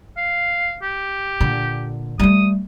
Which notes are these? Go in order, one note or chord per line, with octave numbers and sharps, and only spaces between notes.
F5
G4
A#2 D3
G3 A3 D#6